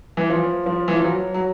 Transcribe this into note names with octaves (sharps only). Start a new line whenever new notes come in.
E3
F3
F3
E3
F3
F#3
F#3